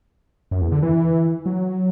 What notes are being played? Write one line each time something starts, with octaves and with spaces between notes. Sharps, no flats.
F#2
E2
D3
E3
F#3